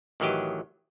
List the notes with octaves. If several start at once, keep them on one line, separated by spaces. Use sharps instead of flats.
A1 D#3 E3 F#3 G4 D#5